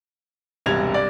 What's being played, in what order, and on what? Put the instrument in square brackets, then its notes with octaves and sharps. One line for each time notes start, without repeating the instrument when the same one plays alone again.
[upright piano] E1 G#6 [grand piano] C2 G2 F7
[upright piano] D5